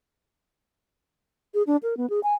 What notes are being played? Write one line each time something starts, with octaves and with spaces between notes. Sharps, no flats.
G#4
D4
A#4
B3
G#4
G#5